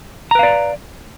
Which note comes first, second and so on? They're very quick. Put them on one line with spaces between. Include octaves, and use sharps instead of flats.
A#5 B4 F5 D5